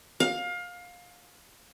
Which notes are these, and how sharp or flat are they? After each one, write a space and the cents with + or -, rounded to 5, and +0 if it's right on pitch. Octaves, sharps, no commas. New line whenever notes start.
F5 +25